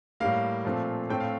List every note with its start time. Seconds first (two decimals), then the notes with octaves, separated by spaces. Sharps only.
0.20 A2 G3 A#3 F5
0.65 A#2 F3 A3 C4
1.09 A2 A3 C4 G5
1.20 F5